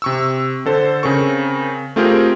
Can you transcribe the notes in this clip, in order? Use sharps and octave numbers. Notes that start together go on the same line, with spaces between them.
C3 C#6 E6
D3 A4 C5
C#3 C4 A#4 C#6
A3 C4 F4 G4 G#4 A#4